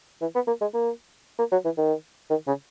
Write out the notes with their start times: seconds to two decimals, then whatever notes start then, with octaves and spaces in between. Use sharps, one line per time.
0.21 E3
0.35 B3
0.47 A#3
0.61 G#3
0.74 A#3
1.39 A#3
1.52 F#3
1.65 E3
1.77 D#3
2.30 D#3
2.47 C#3